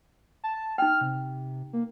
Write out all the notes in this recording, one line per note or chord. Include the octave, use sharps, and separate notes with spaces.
A5
D#4 G5 F6
C3
A#3